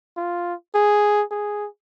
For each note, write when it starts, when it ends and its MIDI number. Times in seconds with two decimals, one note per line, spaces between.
0.17 0.54 65
0.75 1.23 68
1.31 1.67 68